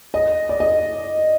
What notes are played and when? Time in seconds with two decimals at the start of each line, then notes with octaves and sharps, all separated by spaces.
0.14 D#5
0.49 D5
0.60 D#5